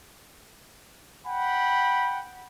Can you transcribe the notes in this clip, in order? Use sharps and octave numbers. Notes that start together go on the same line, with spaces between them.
F#5 G5 B5